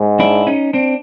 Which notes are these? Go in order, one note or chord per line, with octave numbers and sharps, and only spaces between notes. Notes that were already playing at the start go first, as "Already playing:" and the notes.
Already playing: G#2
D4 E4
C#4 D#4
C4 D4